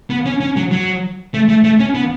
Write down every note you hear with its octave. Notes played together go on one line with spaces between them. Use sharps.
B3
C#4
C#4
F#3
F#3
A3
A3
A3
C#4
B3